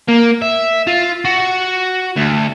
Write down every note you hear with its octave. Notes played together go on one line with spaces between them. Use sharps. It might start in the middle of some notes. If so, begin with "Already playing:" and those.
A#3
E5
F4
F#4
D2